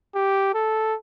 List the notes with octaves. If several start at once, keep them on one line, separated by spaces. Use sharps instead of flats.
G4
A4